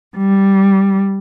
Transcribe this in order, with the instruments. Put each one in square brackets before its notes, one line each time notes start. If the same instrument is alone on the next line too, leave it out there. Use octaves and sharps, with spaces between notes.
[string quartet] G3